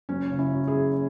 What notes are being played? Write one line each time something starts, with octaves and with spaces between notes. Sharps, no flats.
F#1 C#4
C#3
C#4 E4
F#2
E4 G#4
F#1